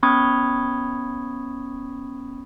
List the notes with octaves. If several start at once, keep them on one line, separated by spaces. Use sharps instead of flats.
B3 C#4 B5 C#6 D#6 G#6